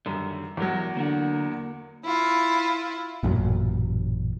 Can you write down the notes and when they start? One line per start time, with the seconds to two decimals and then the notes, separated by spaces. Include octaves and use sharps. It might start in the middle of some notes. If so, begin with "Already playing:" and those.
0.06 F#2 D3 D#3 G3
0.57 E2 E3 F#3 A#4
0.97 D3 A#3 A#4 F#5
2.03 E4 F4
3.23 A1 F#2 A#2 F#3